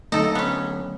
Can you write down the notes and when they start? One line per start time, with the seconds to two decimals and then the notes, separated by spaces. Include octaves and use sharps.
0.12 D3 F#3 A3 D#4 A4
0.35 B3 C#4